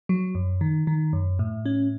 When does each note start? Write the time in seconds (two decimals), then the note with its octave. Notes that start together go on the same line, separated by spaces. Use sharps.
0.09 F#3
0.35 F#2
0.61 D#3
0.87 D#3
1.13 F#2
1.39 A2
1.66 C#4